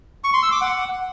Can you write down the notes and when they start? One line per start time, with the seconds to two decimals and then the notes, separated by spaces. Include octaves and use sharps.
0.24 C#6
0.33 C6
0.43 E6
0.52 D6
0.61 F#5